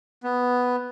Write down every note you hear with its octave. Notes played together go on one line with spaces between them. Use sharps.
B3